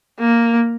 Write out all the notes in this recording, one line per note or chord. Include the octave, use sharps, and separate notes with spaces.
A#3